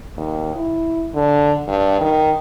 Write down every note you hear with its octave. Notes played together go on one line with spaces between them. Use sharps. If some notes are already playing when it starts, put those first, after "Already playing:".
D#2
E4
D3
G2
D#3